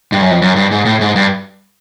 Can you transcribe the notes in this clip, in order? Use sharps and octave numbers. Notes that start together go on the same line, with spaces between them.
G2
F#2
F2
F#2
G2
G#2
A2
G#2
G2